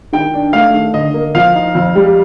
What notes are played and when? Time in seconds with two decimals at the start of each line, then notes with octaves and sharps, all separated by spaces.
0.13 D#3 G5
0.34 D4
0.53 A3 F5
0.74 D#3
0.94 D3 D#5
1.14 A#3
1.35 F3 F5
1.56 D#4
1.75 F2
1.95 G3